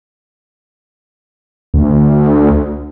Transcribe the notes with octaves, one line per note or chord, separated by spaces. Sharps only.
D2